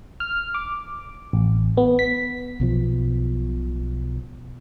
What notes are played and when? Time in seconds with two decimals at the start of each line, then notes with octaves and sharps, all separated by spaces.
0.20 F6
0.54 D6
1.33 A1
1.77 B3
1.99 B6
2.60 B1 B2 F3